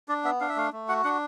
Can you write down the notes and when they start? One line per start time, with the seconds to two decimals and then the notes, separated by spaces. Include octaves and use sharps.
0.08 D4 D5
0.24 B3 E5
0.41 D4 F5
0.49 E5
0.56 A3 F5
0.73 A3
0.89 F#4 F#5
1.04 D4 F#5